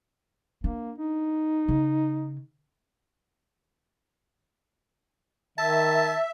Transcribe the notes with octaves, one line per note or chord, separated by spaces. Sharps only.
A#3 D4
D#4
C#3
D#3 E5 A5